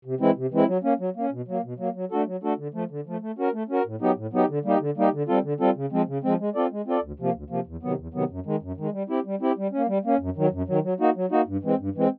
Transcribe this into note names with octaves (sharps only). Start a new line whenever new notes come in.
C3
E3 G#3 C4 E4
C3
E3 G#3 C4 E4
F#3
A#3 C#4
F#3
A#3 C#4
B2
F#3 A#3
B2
F#3 A#3
F#3
A3 D4 F#4 A4
F#3
A3 D4 F#4 A4
D3
F3 A3
D3
F3 A3
A3
C#4 F#4 A#4
A3
C#4 F#4 A#4
A2
F#3 B3 D#4 G4
A2
F#3 B3 D#4 G4
D3
G3 A#3 D#4 G4
D3
G3 A#3 D#4 G4
D3
G3 C4 F4 A4
D3
G3 C4 F4 A4
C#3
F3 G#3 C4
C#3
F3 G#3 C4
G#3
C4 F4 A4 D5
G#3
C4 F4 A4 D5
D2
C3 F3 A#3
D2
C3 F3 A#3
E2
C3 D#3 F#3 B3
E2
C3 D#3 F#3 B3
F#2
D#3 G#3
F#2
D#3 G#3
G3
C4 E4 G4
G3
C4 E4 G4
G3
A#3 C#4
G3
A#3 C#4
F#2
D#3 F#3
F#2
D#3 F#3
F#3
A#3 D#4 F#4
F#3
A#3 D#4 F#4
G2
E3 G#3 C4
G2
E3 G#3 C4